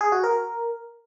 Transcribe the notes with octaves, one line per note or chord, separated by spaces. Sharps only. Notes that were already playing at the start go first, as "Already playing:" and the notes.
G#4
F#4
A#4